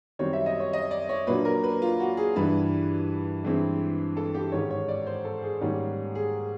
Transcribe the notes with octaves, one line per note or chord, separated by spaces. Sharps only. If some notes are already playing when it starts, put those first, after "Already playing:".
F#2 D#3 G3 C4 C#5
E5
D#5
C#5
D#5
D5
C#5
A#2 F#3 A#3 D4 B4
A#4
B4
F4
F#4
G#4
G2 E3 G3 B4
G2 E3 G#3 C4
A4
G4
G#2 D#3 G#3 C#4 C#5
C#5
D5
C5
A4
G#4
G#2 D#3 G3 A#3 C#4
G#4